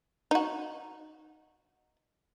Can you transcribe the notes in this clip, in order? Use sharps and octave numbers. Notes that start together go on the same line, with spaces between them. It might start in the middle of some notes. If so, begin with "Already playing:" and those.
D#4 F#4